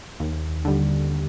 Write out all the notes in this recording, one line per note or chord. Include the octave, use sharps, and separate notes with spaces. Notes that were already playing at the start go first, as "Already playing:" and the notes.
D#2
D3 G3